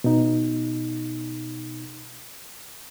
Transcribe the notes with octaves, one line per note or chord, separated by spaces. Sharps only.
B2 D#4